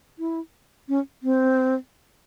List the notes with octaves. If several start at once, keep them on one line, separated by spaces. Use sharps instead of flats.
E4
C#4
C4